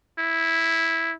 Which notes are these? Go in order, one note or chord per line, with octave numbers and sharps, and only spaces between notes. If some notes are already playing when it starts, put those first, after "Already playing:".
E4